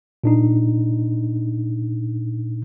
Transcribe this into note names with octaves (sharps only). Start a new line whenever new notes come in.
A#2 D4 D#4